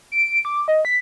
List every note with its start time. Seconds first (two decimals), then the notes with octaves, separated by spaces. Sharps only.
0.12 D7
0.45 D6
0.68 D#5
0.85 B6